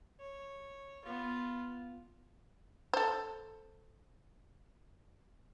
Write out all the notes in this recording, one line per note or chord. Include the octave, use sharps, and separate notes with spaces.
C#5
B3 F4
A4 C5